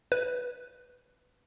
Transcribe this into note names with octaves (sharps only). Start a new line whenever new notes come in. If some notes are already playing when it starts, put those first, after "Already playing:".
B4